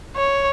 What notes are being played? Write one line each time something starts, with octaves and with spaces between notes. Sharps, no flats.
C#5